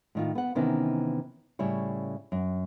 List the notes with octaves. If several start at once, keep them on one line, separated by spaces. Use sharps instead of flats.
A2 D#3 F4
B3 F#5
C3 D#3 E3 B3 C#4 D#4
A2 C#3 G3 E4 C#5
F#2